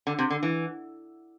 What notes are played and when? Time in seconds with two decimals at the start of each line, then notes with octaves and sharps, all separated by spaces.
0.07 D3
0.19 C3
0.30 D3
0.43 E3